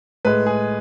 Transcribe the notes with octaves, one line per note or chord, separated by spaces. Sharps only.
A2 G#3 B4
G#4